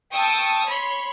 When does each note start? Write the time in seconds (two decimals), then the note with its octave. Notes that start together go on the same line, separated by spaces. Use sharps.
0.12 G5 A5 C#6 D#6 E6
0.66 C#5 B5 C6